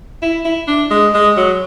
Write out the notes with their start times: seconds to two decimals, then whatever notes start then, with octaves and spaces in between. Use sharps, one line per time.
0.22 E4
0.45 E4
0.68 D4
0.90 G#3
1.14 G#3
1.37 F#3